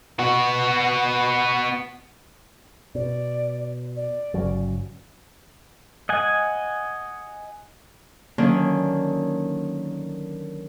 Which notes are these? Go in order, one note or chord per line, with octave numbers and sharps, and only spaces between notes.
B3 F#4
B2 D5
D5
G1 C#3 F#3
D#5 F#5 G#5
D3 D#3 F#3 A#3 C#4